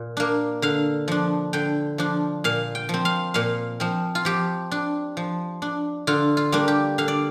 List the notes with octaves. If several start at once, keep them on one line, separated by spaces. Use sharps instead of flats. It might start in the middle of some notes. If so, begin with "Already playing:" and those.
Already playing: A#2
A#3 D4
D3 F5
F3 D4
D3 G5
F3 D4
A#2 F5
G5
F3 C4
F5
A#2 F5
F3 C4
F4
F3 G4
D4
F3
D4
D3 F4
F4
G3 A#3 D4
G4
D3 F5
D5